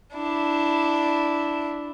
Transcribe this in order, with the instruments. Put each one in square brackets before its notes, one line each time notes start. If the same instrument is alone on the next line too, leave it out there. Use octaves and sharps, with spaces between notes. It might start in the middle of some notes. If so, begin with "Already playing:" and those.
[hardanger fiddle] D4 E4